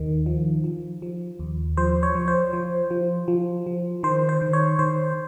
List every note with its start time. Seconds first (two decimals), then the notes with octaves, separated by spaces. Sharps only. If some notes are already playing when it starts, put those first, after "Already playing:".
Already playing: D#2 D#3
0.26 F3
0.64 F3
1.02 F3
1.39 D#2
1.77 F3 C5
2.03 C#5
2.15 F3
2.28 C5
2.53 F3
2.91 F3
3.28 F3
3.66 F3
4.03 D#3 C5
4.29 C5
4.42 D#3
4.53 C#5
4.79 D#3 C5